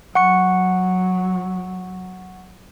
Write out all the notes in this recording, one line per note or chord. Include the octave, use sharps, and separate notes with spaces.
F#3 F#5 C#6 C#7